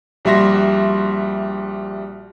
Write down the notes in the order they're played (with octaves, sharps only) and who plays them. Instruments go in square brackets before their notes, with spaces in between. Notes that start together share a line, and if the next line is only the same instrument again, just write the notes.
[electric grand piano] A#1 G3 F#4 E5 C6 A#6